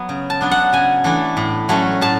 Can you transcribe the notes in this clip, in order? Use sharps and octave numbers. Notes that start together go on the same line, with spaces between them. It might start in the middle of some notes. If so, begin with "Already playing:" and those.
Already playing: F#3 B3
C#3
A5
F#3 B3 D4
F#5
C#3 G#5
E3 A3 D4
A2
F#3 A3 C#4
A2 A5